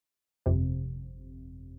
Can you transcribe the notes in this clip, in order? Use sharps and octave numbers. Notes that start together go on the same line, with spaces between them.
G1 F2 C3